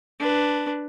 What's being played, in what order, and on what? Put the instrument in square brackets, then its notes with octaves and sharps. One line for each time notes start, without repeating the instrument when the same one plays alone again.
[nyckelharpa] D4 B4